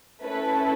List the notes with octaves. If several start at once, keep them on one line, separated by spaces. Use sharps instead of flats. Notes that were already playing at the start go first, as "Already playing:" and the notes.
A3 C#4 E4 A4 B4